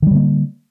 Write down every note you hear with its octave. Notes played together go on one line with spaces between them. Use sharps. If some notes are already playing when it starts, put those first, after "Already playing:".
D3 D#3 G3 A#3